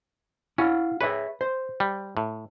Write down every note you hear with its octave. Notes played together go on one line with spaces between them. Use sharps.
C#4 E4 F5 F#5
G#4 B4 C#5 E5
C5
G3
A2